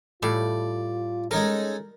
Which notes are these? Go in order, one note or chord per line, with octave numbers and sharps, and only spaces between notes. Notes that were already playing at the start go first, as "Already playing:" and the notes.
A2 G3 F4 D5
G#3 C#4 D#4 A4 A#4